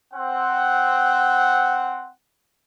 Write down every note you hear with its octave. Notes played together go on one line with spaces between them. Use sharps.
C4 F#5